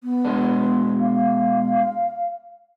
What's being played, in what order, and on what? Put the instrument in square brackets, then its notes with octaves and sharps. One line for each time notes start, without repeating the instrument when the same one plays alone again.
[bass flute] B3
[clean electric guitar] B2 G#3 D4
[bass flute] F5